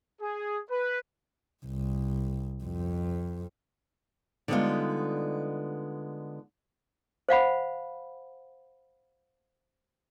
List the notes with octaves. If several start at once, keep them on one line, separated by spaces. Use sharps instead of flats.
G#4
B4
C2
F2
D3 G3 G#3 B3 D#4 F4
C5 F5 F#5 B5